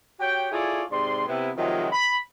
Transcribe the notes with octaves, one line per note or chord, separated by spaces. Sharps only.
F#4 G4 C#5 G5
E4 F4 G#4 A4 C#5 D5
G#2 C3 D5 C6
C3 B3 E4
C3 D#3 F3 F#3 G#3
B5